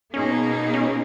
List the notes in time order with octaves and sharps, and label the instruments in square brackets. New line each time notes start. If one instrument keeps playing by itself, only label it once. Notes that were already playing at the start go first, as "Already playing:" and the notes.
[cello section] B2 A#3 D#4 G#4 [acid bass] C#4
[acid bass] C#4